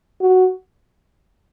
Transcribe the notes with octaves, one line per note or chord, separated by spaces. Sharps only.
F#4